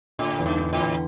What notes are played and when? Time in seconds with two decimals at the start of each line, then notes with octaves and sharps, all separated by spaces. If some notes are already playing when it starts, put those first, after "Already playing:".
0.19 A2 D3
0.39 E2
0.46 G2
0.59 D3
0.73 A2
0.80 E2